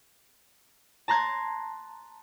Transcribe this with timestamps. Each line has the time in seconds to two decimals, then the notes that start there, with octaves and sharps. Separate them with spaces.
1.08 A5 A#5 C6 F#6 G#6